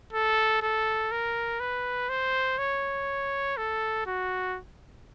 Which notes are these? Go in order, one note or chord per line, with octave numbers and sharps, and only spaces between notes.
A4
A4
A#4
B4
C5
C#5
A4
F#4